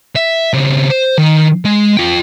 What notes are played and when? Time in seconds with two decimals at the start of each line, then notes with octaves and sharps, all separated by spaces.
0.16 E5
0.53 C#3 C4
0.90 C5
1.18 D#3
1.65 G#3
1.97 F4 G5